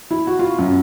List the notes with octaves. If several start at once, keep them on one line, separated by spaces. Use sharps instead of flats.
E4
F#4
F4
F#2